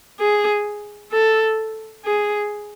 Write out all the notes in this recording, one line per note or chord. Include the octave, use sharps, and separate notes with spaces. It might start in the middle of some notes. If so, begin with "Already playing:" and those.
G#4
A4
G#4